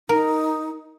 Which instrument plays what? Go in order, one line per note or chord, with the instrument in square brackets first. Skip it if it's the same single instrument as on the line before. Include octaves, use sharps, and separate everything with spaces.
[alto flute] D#4 [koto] A#4